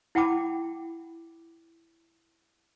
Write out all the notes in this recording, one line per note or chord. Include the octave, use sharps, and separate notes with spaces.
E4 F#5 G5 A5 B5 D6